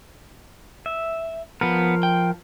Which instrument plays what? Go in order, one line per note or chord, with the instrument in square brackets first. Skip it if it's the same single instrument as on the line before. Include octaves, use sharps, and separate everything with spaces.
[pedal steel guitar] E5
[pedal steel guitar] F3 A#4 [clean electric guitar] B3
[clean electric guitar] G5